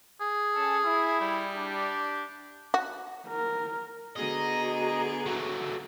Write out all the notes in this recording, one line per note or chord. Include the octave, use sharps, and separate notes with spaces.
G#4
C#4 A4
E4
G3
D4 G4
F#4
A#4
D3 B3 F#4 G#4 D#5 A#5
F#3 A3